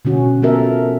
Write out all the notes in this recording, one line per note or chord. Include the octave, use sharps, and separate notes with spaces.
B2 D3 C#4 F#4
B3 F4 A4 A#4 E5